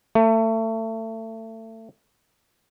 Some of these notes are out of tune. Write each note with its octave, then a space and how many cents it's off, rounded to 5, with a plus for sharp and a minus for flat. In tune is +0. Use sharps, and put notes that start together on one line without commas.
A3 +30